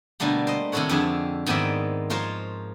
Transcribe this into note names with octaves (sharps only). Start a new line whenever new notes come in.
B2 D3 G3 A3 A#3
C5 D#5
C3 D#3 E4 A4 C#5 F#5
F2 D3 G4 G#4 E5
G#2 D#3 B3 C4 D5 E5
F3 F4 A#4 C5 C#5